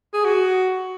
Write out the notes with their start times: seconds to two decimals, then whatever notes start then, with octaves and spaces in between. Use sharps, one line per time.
0.13 G#4
0.25 F#4